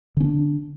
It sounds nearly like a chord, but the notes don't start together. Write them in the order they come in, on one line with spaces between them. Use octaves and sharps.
D3 C#4 D4